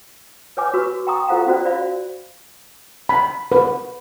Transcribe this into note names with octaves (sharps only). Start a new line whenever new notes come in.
B4 C#5 G#5 D6
F#4 B4 B5 C#6 E6
G5 G#5 A#5 C6 C#6 D#6
F4 A4 C5 F5 F#5 A#5
C#4 F4 F#4 C5 D5
F#4 C5 D5 E5 F5 B5
B5
B4